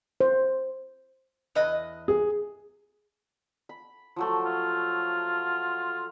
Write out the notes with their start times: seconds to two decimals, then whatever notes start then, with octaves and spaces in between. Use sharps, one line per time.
0.21 C5
1.55 E2 B4 D#5
2.08 G#4
3.69 B5
4.16 F3 F#3 A3
4.45 F4